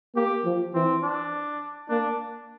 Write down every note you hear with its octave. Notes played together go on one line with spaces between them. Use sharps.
A#3 G4
F3
E3 C4
D4
A#3 D4